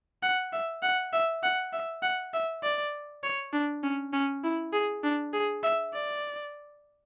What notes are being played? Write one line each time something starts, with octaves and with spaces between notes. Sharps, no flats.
F#5
E5
F#5
E5
F#5
E5
F#5
E5
D5
C#5
D4
C#4
C#4
E4
G#4
D4
G#4
E5
D5